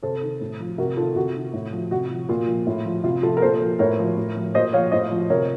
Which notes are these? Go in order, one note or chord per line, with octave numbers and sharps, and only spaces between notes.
C3 A4 C5
D#3
A2
F3
C3 F#4 A#4
D#3 F4 A4
C3 F#4
D#3
A2
F3
C3 F#4
F3
A#2 F4
F3
A2
F3
C3 F4
F3 F4 A4
A#4
A#2 A4 C5
F3
A2 A#4 C#5
F3
A2
F3
A#2 C5 D#5
F3 C#5 F5
A2 C5 D#5
F3
C3 A#4 C#5